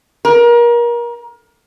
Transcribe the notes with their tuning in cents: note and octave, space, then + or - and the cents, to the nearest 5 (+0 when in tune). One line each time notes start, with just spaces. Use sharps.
A#4 +30